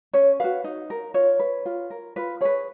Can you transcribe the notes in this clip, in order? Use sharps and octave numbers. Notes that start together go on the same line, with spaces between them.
C#4 C#5
F#4 B4 F5
D#4
A#4
F4 C#5
B4
F4
A#4
F4 B4
G#4 B4 C#5